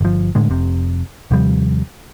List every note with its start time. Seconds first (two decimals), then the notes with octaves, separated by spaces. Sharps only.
0.01 G1 F3
0.35 A2 D3 G#3
0.50 F1 C3
1.31 D#2 C3 F3 G3